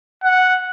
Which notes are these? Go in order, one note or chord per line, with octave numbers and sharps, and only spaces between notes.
F#5